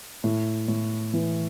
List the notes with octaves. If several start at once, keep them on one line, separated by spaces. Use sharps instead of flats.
A2
A2
E3